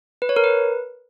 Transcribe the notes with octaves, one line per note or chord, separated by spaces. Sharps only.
B4
C#5
A#4
B4